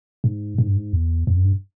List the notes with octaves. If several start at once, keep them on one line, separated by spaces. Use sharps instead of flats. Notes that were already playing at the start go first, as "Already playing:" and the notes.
G#2
G#2
G2
G#2
E2
F2
F#2
G2